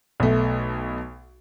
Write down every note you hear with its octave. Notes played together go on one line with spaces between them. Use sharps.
B1 B2 A3